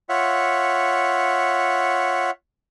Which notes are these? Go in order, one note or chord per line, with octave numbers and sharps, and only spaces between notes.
F4 C#5 E5 F#5